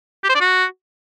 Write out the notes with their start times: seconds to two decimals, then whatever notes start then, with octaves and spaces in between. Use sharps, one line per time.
0.24 G4
0.29 C5
0.35 D5
0.41 F#4